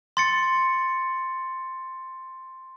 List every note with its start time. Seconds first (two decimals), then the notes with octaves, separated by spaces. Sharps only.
0.17 C6 A6 C#7